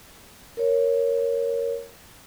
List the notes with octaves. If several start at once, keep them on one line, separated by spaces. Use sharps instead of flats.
A#4 C#5